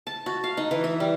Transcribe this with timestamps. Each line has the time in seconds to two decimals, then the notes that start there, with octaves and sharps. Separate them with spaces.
0.07 A5
0.26 F#4
0.44 F5
0.57 D#4
0.71 E3
0.84 E5
1.00 G3